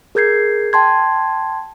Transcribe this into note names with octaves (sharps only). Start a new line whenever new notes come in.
G#4 A#4 G6 G#6 C7
G5 A5 C6 G#6